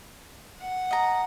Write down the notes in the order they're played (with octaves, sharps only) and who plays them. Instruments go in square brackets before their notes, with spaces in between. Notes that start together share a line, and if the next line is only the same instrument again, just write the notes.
[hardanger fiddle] F#5
[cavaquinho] D#5 A#5